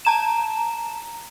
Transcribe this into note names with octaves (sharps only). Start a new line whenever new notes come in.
A5 A#5 E7